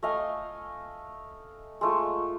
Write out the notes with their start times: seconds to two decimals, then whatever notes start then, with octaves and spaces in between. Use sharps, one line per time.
0.03 A3 D#5 F5 G#5
1.81 G#3 A3 F4